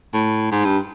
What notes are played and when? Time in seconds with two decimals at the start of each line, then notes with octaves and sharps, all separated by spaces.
0.13 A2
0.52 G#2
0.65 G2